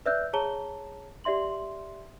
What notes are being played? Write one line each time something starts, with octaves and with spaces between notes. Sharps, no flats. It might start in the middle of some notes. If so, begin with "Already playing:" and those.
B4 D5 E5 E6 F#6 G6
G#4 C#5 A5 A#5 G7
G4 D5 E5 C6 F#7